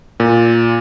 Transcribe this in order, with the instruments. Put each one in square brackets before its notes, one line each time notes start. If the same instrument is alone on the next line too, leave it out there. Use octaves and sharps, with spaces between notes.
[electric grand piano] A#2